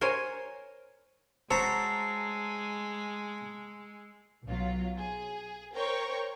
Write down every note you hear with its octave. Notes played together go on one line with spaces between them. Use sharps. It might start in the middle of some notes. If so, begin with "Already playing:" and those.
A#4 C5 C#5 G#5
G#3 F#4 C5 C#5 A5 A#5 E6 C7
B1 F#3 F4
G#4
A#4 C5 C#5 G5 C#6